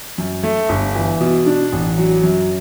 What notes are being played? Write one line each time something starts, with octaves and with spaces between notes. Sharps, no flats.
F#2
A3
G1
E3
B2
D4
A1
F#3
F#2